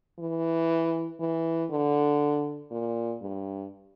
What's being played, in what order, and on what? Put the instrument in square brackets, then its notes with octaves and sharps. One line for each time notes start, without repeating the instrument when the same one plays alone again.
[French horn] E3
E3
D3
A#2
G2